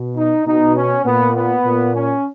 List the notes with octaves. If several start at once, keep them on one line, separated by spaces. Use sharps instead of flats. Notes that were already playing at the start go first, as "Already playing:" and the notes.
Already playing: B2
D#4
B2 D#4
C#4
A#2 B3
B3
A#2
C#4